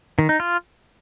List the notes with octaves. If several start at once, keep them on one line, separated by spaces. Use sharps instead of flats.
D#3
D#4
F4